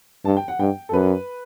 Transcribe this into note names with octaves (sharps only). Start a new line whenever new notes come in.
G2 A5
G5
F#5
G2 G5
A4
F#2 B4